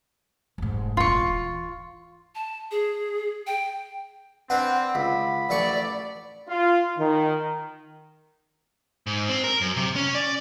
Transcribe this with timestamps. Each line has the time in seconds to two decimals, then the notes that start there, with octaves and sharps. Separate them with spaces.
0.58 F1 G#2
0.97 D#1 G#1 F4 C#6
1.19 E3
2.35 A5
2.71 G#4
3.47 G5
4.50 C4 D4 B4 F#5
4.95 C#2 B5
5.50 A1 A4 D5 C#6
6.48 F4
6.98 D#3
9.07 G#2
9.29 C4
9.44 A#4
9.61 F#2
9.77 C3
9.96 C#4
10.15 D5